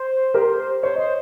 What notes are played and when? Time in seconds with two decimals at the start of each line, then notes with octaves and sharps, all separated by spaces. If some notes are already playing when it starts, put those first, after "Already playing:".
Already playing: C5
0.34 G4 A#4
0.83 C5 C#5
0.96 C5 D#5